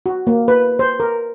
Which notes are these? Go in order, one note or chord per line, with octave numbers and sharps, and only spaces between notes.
F#4
A#3
B4
C5
A#4